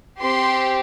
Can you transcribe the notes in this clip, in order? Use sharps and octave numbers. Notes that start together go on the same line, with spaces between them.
C4 G4 C6